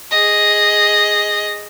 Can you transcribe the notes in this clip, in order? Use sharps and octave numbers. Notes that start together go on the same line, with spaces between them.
G#4 D#5